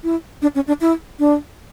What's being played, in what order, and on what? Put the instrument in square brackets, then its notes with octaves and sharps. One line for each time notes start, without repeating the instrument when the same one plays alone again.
[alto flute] E4
D4
C#4
D4
E4
D4